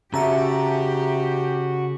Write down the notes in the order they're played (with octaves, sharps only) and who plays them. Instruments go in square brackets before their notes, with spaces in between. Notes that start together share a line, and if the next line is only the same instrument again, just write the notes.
[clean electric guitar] C#3 C#4 [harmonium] F#4 [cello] G4 [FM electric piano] E5 A5 A#5